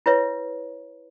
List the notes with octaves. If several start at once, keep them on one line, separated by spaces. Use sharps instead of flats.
E4 B4 C#5 E5